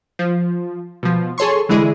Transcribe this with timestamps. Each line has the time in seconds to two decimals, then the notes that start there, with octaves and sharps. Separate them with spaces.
0.19 F3
1.03 B2 F3
1.38 G#4 A4 C#5 C6 C#6
1.69 D3 E3 G#3 E4 G#4